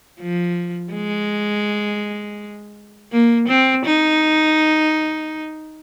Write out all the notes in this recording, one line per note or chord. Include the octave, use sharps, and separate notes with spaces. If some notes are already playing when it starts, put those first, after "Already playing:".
F3
G#3
A#3
C4
D#4